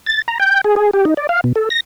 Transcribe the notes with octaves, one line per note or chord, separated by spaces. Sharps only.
A6
A#5
G5
G#4
G#4
G4
D#4
D5
F5
B2
A4
A#6